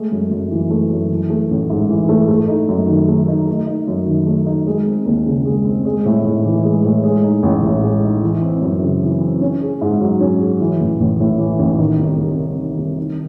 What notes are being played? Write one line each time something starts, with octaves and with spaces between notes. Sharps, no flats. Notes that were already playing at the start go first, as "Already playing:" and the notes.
Already playing: G#3 A3
F#2
F#2
E3
A3
F#2
E3
A3
A1
G#2
E3
A3
A3
D#4
F#2
D#3
A3
D#4
A3
D#4
F#2
D#3
A3
D#4
G#3
C4
D#2
C#3
G#3
C4
G#3
A2
A2
E3
G#3
A2
G#3
D#4
A1
A2
G#3
D#4
E3
C4
F#2
C#3
E3
C4
C#4
G#4
G#2
F#3
C#4
G#4
E3
A1
A1
A2
E3
A1
D#3
C2
C2
C3
D#3
C2
D#3